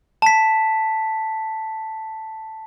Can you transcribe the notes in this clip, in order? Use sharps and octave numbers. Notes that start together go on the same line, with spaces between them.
A5 B6